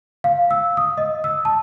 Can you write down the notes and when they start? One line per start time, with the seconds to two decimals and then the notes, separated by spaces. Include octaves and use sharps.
0.24 F5
0.51 E6
0.77 D#6
0.98 D#5
1.24 E6
1.45 A5